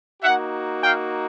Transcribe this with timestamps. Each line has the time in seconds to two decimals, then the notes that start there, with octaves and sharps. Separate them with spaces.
0.23 A#3 D#4 F#4 E5 F#5
0.83 F5 G5